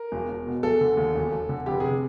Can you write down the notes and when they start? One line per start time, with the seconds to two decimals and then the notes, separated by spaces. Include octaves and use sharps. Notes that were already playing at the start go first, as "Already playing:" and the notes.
Already playing: A#4
0.12 E1
0.29 E1
0.46 B2
0.63 E1 A4
0.81 D3
0.97 D#2
1.15 E1
1.32 E1
1.49 D3
1.66 F1 G4
1.80 C3 G#4